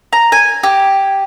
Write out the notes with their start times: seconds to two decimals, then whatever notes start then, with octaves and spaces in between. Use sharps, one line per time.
0.13 A#5
0.32 G#5
0.63 G4